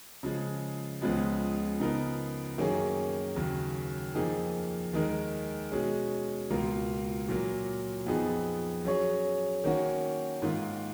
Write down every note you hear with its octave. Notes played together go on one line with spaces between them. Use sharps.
C#3 F3 G#3
C#2 C#3 F3 G#3 B3
C#3 F3 B3 D#4 A#4
F#2 D#3 A#3 C#4 G#4
D#2 C#3 F#3
F2 F3 A#3 D#4 G#4
D#2 D#3 G#3 D#4 A#4
B2 G#3 C#4 G#4
C#2 B2 A#3 F4 A#4
A#2 F#3 A#3
F2 F3 B3 D#4 G#4
F#3 C#4 G#4 C#5
D#3 A#3 C#4 F#4
G#2 D#3 A#3 F4